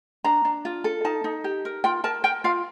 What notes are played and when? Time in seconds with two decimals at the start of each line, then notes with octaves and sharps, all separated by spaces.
0.24 D4 A#5
0.45 D4
0.65 F4
0.84 A4
1.05 D#4 A5
1.24 D#4
1.44 G4
1.65 A#4
1.84 F4 G5
2.04 A#4 A5
2.24 A#4 G5
2.44 F4 F5